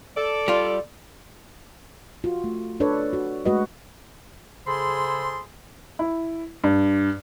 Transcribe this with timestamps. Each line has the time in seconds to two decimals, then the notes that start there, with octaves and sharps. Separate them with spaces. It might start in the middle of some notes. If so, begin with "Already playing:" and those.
0.16 A4 D5
0.48 G3 F4
2.24 F4 F#4
2.44 A3
2.80 D4 A4 B4 C#5 D5
3.13 F#4
3.45 G#3 A3 F#4 B4 D#5
4.66 C#3 G#4 A4 C5 B5 C6
5.99 E4
6.64 G2